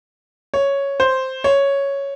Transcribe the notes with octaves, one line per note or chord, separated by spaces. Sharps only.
C#5
C5
C#5